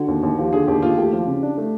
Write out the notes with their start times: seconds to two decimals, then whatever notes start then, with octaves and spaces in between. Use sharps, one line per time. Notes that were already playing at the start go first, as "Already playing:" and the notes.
Already playing: D3 F#4
0.08 D#2
0.23 D#2
0.38 F3 G4
0.53 D3 G#4
0.68 D#2 G4
0.82 D#2 F4
0.97 A3 G4
1.12 F3
1.27 C#3
1.43 D4
1.58 A3